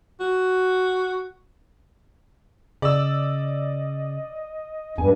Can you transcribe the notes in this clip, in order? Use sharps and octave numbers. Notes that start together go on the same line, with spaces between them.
F#4
C#3 D5 D#5 E6
E2 G2 G#5